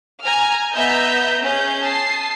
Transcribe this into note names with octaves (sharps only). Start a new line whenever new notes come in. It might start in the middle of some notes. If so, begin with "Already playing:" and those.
G#5 A#5 F6
B3 D#5 E5 A#5 G6
C#4 G#4 G6
A5 D#6 C7